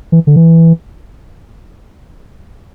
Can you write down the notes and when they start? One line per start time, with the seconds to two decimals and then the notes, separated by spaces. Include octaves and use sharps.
0.12 E3
0.27 D3
0.36 E3